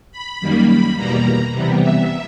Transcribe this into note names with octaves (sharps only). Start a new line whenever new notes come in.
B5
F#2 D#3 G3 A#3
B5
E2 B2 G3 A#3 A#5
C3 E3 G3 B3
E5